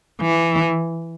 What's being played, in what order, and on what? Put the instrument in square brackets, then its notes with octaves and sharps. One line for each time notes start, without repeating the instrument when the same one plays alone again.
[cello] E3